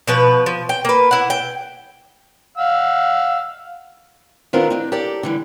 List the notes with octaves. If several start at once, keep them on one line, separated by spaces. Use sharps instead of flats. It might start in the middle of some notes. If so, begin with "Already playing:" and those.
B2 F3 B4
F3
G5
A#3 B4
E4 F#5
G5
F5 F#5 E6
D#3 B3 C4 D4 F4 A#4
D4 D#4
G4 A4 A#4 D5
D3 E3 G3